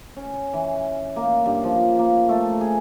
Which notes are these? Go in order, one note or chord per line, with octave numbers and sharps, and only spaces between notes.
C#4
E3
A#3
G2
F3
A#3
A3
G#4